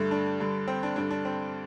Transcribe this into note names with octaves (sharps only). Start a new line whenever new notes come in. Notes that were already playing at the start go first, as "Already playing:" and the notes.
Already playing: G2 D3 A3
D4
G2 D3
C4
D4
G2 D3 D4
D4
C4